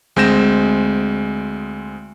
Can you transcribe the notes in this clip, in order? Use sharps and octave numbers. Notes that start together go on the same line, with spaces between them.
D2 G#3 C4 G6 A#6 E7